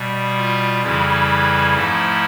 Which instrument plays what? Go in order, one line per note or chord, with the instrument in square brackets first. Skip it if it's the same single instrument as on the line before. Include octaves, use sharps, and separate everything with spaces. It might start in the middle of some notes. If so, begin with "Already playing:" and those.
Already playing: [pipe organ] B2 G3
F4
F2 C#3 E3 G3 E4
G#2 F3 A3